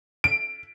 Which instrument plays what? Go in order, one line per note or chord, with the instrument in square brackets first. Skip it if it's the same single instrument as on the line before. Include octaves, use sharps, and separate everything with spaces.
[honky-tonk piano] D7